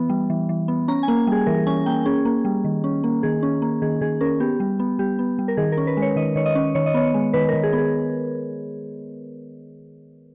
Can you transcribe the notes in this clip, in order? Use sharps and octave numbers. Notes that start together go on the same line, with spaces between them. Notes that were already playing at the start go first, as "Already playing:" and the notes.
Already playing: E3 B3
G3
E3
E3
B3
C#4 A#5
G#5
A#3
G3 G#4
E3 A#4
C#4 G#5
A#3 G5
C#4 G#4
A#3
G3
D#3
C#4
A#3
D#3 G#4
C#4
A#3
D#3 G#4
D#3 G#4
C#4 A#4
B3 G4
G3
B3
G3 G4
B3
G3
A#4
D#3 G#4
A#4
C#4
B4
G#3
C#5
D#3 D#5
D#3 C#5
D#5
C#4
D#3 C#5
D#5
B3 C#5
G#3
D#3 B4
A#4
D#3
G#4
B3
G#4